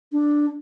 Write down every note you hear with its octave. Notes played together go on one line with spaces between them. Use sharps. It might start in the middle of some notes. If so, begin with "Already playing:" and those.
D4